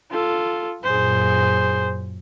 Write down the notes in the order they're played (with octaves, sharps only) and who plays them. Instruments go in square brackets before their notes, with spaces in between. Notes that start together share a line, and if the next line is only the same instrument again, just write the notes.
[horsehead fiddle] F4 A4
[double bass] F#2 A#2 [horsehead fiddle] G#4 C5